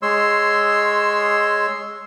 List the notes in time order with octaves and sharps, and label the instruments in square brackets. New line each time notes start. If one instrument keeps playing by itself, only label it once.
[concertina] G#3 C#5 C6 E6